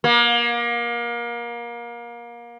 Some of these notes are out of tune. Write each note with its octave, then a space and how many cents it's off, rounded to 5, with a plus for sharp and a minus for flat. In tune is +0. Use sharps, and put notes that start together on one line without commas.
A#3 +30